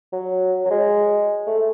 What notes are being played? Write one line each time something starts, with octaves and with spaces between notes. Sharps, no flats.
F#3
F#3
G#3
A3